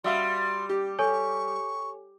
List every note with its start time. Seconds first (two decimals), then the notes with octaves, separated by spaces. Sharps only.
0.04 G3 F#4 E5 F5 C6
0.69 G4
0.99 A4 C#5 G#5 C#6